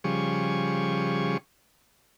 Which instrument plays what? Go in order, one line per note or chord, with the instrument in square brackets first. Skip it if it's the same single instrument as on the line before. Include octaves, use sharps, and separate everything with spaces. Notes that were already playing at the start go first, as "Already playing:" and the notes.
[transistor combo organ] C#3 F3 G3 G#4 C#6